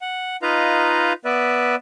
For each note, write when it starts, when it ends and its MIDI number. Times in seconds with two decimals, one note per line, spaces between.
0.01 0.36 78
0.42 1.13 63
0.42 1.13 65
0.42 1.13 71
0.42 1.13 75
0.42 1.13 77
0.42 1.13 82
1.25 1.76 59
1.25 1.76 71
1.25 1.76 74
1.25 1.76 76